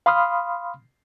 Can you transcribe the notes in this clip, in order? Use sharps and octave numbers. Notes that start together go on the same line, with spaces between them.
F5 B5 C6 D#6 F6